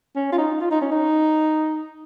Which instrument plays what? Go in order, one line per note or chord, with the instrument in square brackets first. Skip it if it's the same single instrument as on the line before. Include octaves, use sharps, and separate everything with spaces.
[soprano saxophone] C#4
F4
D#4
F4
D#4
C#4
D#4